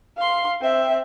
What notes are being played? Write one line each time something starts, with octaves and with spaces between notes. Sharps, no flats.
F5 C6
C4 E5